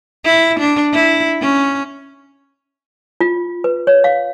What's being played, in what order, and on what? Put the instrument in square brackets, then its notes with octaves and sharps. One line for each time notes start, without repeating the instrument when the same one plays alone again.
[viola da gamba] E4
D4
E4
C#4
[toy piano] F4
B4
C#5
F5